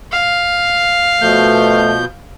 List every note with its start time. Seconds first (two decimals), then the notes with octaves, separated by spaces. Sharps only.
0.12 F5
1.21 B2 F3 A3 G6